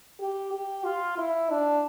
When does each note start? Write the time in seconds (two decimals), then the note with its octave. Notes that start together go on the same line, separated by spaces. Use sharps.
0.20 G4
0.53 G4
0.85 F4
1.18 E4
1.50 D4